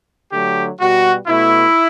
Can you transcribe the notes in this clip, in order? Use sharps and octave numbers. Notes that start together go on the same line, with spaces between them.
D3 F#3 A3 G4
B2 G3 F#4
B2 A3 E4